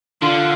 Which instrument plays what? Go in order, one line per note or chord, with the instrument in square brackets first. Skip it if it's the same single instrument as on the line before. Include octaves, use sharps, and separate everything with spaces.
[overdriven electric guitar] D3 [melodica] F4